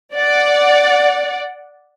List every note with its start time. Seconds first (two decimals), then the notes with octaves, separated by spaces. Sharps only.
0.15 D5 F#5